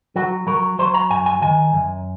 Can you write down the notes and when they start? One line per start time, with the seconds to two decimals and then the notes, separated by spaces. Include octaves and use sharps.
0.16 F#3 F#4
0.47 F#3 A#4
0.79 F#3 C5
0.94 A#5
1.10 F#2 G#5
1.26 G#5
1.42 D#3 G#5
1.73 F#2